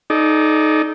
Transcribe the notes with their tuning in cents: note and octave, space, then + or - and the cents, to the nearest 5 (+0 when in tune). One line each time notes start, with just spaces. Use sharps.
D#4 +0 A4 -40 D5 +0